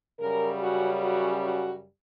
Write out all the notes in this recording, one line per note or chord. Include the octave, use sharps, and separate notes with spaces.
F#2 C#3 G3 A#4
F#4
F#4
F#4